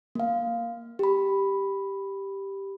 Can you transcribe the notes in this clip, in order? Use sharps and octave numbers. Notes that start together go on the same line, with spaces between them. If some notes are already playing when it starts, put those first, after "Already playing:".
A#3 F5
G4 B5